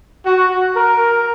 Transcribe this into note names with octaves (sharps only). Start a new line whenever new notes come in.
F#4
A#4